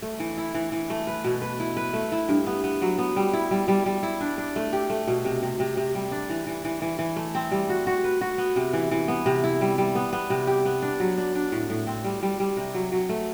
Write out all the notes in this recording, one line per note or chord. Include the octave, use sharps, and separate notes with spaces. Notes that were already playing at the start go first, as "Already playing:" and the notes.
A3
E3
E4
E3
E3
A3
B4
B2
B4
E4
B4
A3
E4
G2
B3
B3
F#3
B3
G3
E4
G3
G3
G3
E4
D4
D4
A3
G4
A3
B2
C3
C3
C3
C3
G3
D4
E3
E3
E3
E3
E3
A3
C4
G3
F#4
F#4
B4
F#4
B3
C3
E3
E3
B3
C3
E4
G3
G3
B3
B3
C3
G4
B3
D4
F#3
D4
D4
A2
A2
C4
G3
G3
G3
C3
F#3
F#3
A3